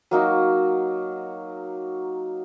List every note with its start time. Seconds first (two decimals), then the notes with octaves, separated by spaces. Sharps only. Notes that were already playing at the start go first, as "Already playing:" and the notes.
0.11 F#3 A#3 D#4 F#4